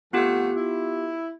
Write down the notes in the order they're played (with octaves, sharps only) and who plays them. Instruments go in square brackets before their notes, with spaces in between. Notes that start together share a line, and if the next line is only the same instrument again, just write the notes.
[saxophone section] F2 A3 F#5 [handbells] B3 F4 G4
[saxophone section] E4